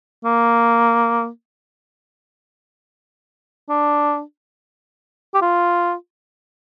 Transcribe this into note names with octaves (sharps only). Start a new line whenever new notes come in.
A#3
D4
G4
F4